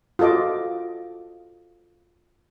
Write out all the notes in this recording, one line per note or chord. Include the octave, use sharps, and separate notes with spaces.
F4 F#4 A4 D#5 D6